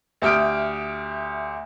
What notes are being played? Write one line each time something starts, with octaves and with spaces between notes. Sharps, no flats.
D2 G4 E5 D#6 F6 D7